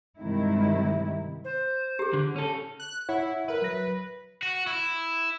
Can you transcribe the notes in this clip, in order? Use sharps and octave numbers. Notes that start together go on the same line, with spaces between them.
G2 C3 D#3 G#3 E4
C5
G4 G#4
D3
C#4 A4
F#6
E4 C#5 F#5
A#4 B4 E5
F#3 A#6
F#4
E4